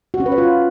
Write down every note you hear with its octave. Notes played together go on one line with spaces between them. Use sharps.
F#4
C#4
B4
C#5
F4